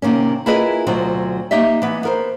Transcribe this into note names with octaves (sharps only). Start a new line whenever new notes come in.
C3 D#3 A#3 C#4
E4 F4 G#4 A#4 B4 D#5
D2 B2 F#3 C4 F4
A#3 D#4 G4 D#5 E5
E3 B3
B3 A#4 C5